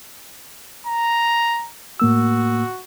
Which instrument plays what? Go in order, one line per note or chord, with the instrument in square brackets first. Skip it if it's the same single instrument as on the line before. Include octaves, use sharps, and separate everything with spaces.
[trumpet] A#5
[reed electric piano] A2 A#3 E6 [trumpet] F#4